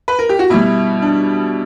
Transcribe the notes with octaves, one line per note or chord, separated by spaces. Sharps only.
B4
A#4
G4
F#4
B2 G3 E4
D4